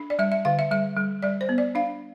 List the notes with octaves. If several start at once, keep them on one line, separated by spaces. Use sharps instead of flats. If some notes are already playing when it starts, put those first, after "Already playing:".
Already playing: D4
D5
G3 E5
E5
D3 F5
E5
G3 E5
G3
G3 D5
C5
B3
D5
D4 F5